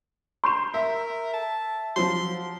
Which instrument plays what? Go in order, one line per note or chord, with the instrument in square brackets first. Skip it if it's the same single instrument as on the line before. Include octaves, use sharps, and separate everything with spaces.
[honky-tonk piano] C6 G6 E7
[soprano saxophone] A#4 [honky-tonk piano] E5
[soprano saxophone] A5
[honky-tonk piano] F3 F#3 [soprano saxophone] C6